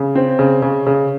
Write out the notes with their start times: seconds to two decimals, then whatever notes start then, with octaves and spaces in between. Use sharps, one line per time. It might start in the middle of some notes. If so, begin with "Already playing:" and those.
Already playing: C#3
0.15 C4
0.39 C#3
0.62 C#3
0.87 C#3